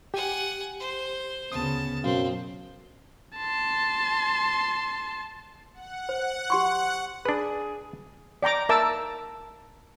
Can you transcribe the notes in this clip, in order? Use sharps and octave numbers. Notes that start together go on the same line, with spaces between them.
G4 F#5 G#5
C5
D2 C#3 B3 A5 D#6
F#2 B2 C4 F5
A5 C6
F#5
C5
G4 C6 C#6
D4 G#4 B4
D5 G5 A#5 D6
A#4 E5 A5 D6 E6